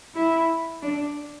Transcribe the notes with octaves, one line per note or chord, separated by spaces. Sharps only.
E4
D4